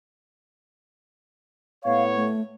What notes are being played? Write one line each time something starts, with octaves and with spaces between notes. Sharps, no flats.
A2 B3 C#5 F5
A3